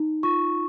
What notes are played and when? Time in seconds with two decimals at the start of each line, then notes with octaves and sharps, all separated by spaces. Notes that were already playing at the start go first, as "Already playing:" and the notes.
Already playing: D#4
0.23 F4 C#6